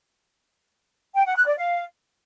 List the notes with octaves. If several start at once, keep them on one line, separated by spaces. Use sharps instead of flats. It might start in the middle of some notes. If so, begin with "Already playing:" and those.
G5
F#5
F#6
D5
F5